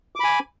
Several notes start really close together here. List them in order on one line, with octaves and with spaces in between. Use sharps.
D6 B5 G#5